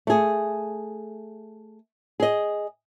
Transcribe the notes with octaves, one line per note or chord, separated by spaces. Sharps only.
A3 G#4
G#4 D#5